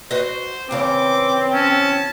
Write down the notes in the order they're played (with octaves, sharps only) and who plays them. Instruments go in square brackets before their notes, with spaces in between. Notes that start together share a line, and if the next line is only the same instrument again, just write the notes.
[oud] F#4 B4 D#5 [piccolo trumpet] C5
[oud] E2 C#3 E3 [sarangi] C4 [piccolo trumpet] D6
[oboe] C#4 [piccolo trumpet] A5